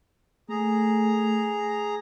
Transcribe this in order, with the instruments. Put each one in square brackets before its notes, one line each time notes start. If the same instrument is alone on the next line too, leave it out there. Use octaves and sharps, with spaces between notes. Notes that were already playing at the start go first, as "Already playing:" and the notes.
[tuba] A3 [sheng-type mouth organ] G#4 A#5